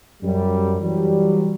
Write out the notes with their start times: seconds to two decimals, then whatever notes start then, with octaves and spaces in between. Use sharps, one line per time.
0.23 F#2 G3
0.82 E3 F#3 G3